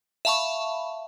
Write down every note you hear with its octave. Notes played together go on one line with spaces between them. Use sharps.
E5 F5 A5 B5 C#6